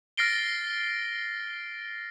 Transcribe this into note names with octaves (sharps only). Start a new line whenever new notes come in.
F6 A6 A#6 C7 D7 G7